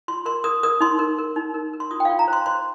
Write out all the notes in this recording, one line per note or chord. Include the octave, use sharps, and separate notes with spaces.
F4 C6
A#4 C6
A#4 D#6
A#4 D#6
D#4 C6
A#4
A#4
D#4
A#4
A#4
C6
F4 D#6
G5
F4 F5
A#5
C5
C6
C5 C6